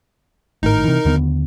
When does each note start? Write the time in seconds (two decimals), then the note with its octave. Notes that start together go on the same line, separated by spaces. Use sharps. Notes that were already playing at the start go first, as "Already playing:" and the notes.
0.63 G#1 A2 D#4 A#4
0.84 C3 E3
1.05 D#2 D3 B3